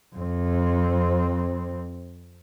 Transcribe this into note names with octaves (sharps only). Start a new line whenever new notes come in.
F2 C4